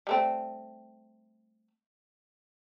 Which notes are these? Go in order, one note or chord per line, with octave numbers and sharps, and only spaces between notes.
G3 A3 C4